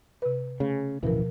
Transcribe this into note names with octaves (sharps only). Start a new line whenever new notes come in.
C3 B4
C#3 A3
D1 F#2 B2 E3 F3 A#4